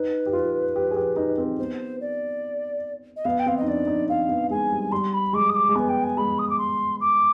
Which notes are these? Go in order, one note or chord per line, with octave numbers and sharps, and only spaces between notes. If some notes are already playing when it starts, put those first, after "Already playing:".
Already playing: D#4 B4
G4
F4
G4
G#4
G4
D#4
C4
B3 C5
D5
D#5
B3 F5
G5
C4 F5
D#4 D#5
D4 D5
D#4
C4 F5
B3
G#3 G#5
G3
G3 C6
B5
G#3 D6
D#6
D6
G#3
B3 G#5
G5
G#5
G#3 B5
D#6
D6
C6
D6